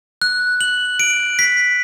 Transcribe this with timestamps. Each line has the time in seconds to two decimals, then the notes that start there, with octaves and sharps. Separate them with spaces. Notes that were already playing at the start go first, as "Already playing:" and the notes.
0.22 F#6
0.61 F#7
1.00 D7
1.39 B6